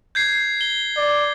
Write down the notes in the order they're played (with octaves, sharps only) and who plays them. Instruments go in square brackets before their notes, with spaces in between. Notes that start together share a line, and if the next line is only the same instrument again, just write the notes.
[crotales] G6 G#6 C7
G7
[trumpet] D5